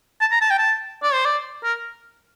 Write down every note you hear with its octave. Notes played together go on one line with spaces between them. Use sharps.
A5
A#5
A5
G5
A5
D5
C5
D5
A#4